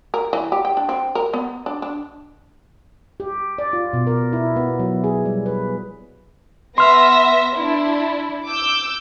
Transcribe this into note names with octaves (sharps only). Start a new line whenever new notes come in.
A#4
E3
G4
G5
D4
C4
A#4
B3
D4
D4
G4
D5
F4
B2
A#4
E4
B3
F#3
G#4
G3
B4
B3 E5 C6 F6 A#6
D4 E4
D6 E6 G6